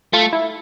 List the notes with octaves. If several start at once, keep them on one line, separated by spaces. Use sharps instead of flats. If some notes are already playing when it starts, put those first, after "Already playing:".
A3 F4
E4